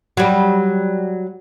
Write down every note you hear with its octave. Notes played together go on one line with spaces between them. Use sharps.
F#3 G3